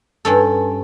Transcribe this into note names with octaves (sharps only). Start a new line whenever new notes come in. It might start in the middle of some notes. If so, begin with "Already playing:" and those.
G2 C#4 A4